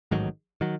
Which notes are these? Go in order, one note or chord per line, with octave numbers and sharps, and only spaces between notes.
A1 G#2 D#3 F#3
D#3 F#3